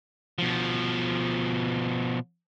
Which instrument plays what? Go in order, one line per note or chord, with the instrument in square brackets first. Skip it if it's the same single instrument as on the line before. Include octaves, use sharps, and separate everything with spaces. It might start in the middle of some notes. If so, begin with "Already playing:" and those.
[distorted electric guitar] B2 F3